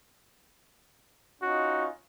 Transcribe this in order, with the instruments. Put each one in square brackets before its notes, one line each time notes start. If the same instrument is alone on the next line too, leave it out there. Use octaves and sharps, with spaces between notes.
[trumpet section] C#4 D#4 F4 [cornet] F#4